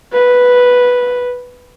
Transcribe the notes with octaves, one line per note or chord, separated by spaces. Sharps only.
B4